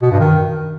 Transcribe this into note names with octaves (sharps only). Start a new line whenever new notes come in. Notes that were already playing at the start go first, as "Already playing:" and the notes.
B2
G2
D#3